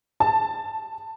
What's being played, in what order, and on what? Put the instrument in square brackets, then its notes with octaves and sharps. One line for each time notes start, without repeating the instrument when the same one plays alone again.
[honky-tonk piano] A5